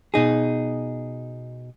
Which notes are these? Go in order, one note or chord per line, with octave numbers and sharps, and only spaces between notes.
B2 D#4 G#4